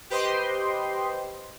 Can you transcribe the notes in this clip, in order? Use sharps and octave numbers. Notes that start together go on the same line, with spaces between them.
G4 B4 C5 D#5 G5 C6